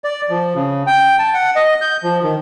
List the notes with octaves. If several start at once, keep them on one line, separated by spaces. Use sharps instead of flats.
D5
F3
C#3
G5
A5
F#5
D#5
G6
F3
D#3